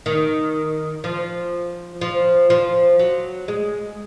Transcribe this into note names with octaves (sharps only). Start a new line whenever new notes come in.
D#3
F3
F3
F3
F#3
G#3